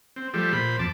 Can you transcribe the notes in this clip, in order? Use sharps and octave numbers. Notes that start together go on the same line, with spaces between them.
C4
F3 G3 A3 G4
A#2 C5 B5
F2 A5 D6